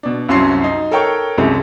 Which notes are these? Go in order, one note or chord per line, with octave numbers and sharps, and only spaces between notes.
B2 D4
C2 F#2 F#3 C#4 C6 C7
D#4
A4 A#4 C#5 G5 C#6
C2 F#2 C3 G#3